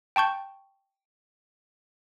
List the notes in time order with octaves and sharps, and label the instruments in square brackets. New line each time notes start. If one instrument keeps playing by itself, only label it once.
[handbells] G5 A5 C#6 G6